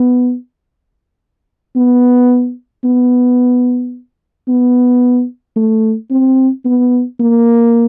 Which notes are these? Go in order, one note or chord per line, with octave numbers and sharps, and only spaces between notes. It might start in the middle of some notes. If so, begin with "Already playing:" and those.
Already playing: B3
B3
B3
B3
A3
C4
B3
A#3